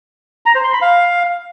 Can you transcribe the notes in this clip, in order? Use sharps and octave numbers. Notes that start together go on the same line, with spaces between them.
A#5
C5
C6
B5
F5